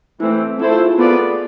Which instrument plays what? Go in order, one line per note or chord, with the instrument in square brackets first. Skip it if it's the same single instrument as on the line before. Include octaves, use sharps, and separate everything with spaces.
[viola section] E3 A3 C4 [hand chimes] E4
[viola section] A3 E4 A4 C5 [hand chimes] C4
[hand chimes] F4
G#4
[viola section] B3 F4 B4 D5 [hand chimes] A4